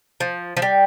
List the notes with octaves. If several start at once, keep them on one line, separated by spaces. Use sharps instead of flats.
F3
F3
G3